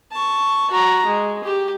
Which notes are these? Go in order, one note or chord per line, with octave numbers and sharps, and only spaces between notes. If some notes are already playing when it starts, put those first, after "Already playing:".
A5 C#6
F#4 A#5
G#3
G4